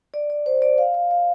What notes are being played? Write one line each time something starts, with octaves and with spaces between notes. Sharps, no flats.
D5
D5
C5
D5
F5
F5
F5